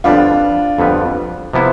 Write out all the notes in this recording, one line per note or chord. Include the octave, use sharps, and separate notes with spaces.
F2 D3 G3 B3 D4 F4
F2 D3 G3 B3
C3 F3 B3 E4